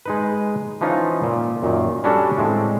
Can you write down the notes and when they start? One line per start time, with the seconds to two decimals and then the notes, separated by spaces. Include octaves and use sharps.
0.06 G#3 D#4 B4
0.81 E3 F3 C#4 D#4 F4
1.24 A#2
1.63 F#2 A#2 D#3
2.04 G3 C#4 D4 F#4 G4 A4
2.38 A2 G#3 C4